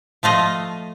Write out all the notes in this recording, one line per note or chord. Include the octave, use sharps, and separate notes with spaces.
F3 A3 F4 D#5